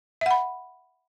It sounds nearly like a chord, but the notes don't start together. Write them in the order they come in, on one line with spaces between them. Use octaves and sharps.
E5 F#5 B5